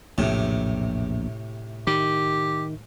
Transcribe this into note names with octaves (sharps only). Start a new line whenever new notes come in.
A#1 E2 A2 C3
D#3 G4